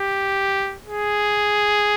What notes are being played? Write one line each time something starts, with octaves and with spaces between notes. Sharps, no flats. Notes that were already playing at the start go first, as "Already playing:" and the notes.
Already playing: G4
G#4